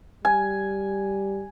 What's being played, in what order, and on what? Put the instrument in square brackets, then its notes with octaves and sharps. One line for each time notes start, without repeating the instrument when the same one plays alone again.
[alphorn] G3 [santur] G#5